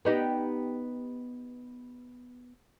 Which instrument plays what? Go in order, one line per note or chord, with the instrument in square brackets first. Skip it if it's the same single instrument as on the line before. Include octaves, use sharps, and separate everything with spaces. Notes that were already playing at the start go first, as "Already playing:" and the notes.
[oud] B3 D#4 G4